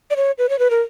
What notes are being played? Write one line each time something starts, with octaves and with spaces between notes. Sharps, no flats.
D5
C#5
B4
C#5
B4
A#4